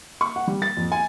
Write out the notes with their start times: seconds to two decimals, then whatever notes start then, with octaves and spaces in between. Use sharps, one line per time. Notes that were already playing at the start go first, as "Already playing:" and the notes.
0.21 C#6
0.36 F#5
0.47 G3
0.62 A6
0.77 F2
0.92 G#5